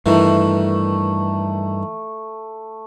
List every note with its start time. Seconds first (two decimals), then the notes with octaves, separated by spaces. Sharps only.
0.06 G2 D#3 E3 A3